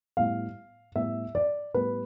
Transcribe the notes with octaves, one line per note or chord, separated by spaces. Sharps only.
A2 G3 B3 F5
A2 G3 B3 E5
D5
A2 G3 B3 B4